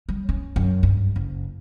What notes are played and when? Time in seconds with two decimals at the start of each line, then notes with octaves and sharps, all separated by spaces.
0.09 G3
0.29 C#4
0.56 F#2
0.83 G2
1.16 F#1